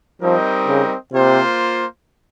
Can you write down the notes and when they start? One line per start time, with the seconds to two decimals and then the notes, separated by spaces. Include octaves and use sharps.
0.22 F3 G3 C4 D#4 A#4 D#5
0.68 C#3
1.12 C3 A#3 F4 C5